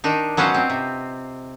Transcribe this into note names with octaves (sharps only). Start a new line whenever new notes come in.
D#3 D4 D#4
F#3 B3 C#4 F4 C5
C4
C3